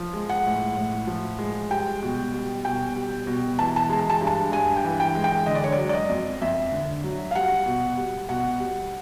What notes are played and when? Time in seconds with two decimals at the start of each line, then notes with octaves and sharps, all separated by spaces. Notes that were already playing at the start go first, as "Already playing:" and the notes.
Already playing: F3
0.13 G#3
0.29 F#5
0.46 A2
0.77 A2
1.07 F3
1.39 G#3
1.71 G3 G5
2.03 B2
2.33 G3
2.65 B2 G5
2.96 G3
3.27 B2
3.59 E3 A5
3.76 A5
3.90 G#3 A5
4.10 A5
4.21 G2
4.27 A5
4.52 G2 G#5
4.76 G5
4.84 E3
5.00 G5
5.15 G#3
5.24 G5
5.46 D3 D#5
5.55 D5
5.64 C#5
5.72 D5
5.78 F#3
5.89 D5
5.93 D#5
6.09 F2
6.42 F2 E5
6.72 D3
7.04 F#3
7.31 F5
7.35 G3 F#5
7.66 B2
7.98 G3
8.29 B2 F#5
8.60 G3